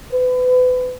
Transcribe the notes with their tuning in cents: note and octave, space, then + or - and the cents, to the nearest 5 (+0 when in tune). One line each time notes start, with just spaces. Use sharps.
B4 +30